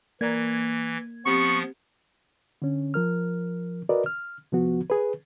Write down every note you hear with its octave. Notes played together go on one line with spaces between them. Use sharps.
E3 A#3 D5 A#5 G#6
F3 B3 C4 G4 B5 C#6
D3 C#4
F3 A#4 F6
F#4 A#4 B4 D5 D#5
F6
C2 F3 B3 F#4
G#4 B4